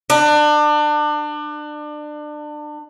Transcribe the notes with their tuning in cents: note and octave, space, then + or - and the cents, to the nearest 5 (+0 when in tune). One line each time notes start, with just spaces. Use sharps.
D4 +30